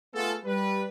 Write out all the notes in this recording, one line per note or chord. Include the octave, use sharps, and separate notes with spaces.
A3 B3 F4 G#4 A4
G3 B4